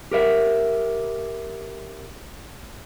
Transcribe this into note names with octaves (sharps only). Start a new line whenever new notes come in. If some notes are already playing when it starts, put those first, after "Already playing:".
G4 A#4 E5